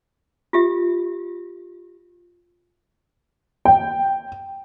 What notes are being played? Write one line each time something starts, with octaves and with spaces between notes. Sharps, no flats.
F4 G4 E5
G5